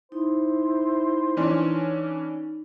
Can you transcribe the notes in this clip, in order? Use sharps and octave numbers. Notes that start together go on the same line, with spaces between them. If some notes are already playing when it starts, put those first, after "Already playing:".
D#4 E4 C5
E3 C#4 D4